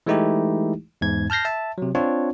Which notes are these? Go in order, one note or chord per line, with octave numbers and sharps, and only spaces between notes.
E3 G#3 A3 D#4 E4 G4
E2 G#2 G#6
A5 F6 G6 A#6 C7
E5 A5
C3 F#3
C4 D4 F4 C#5